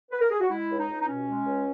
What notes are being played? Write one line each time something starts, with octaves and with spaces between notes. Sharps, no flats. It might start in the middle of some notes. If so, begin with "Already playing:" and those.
B4
A#4
G#4
F#4
G#3 E4
C#2
D#4
C#2
D#4
B2 C#4
G#3
C#2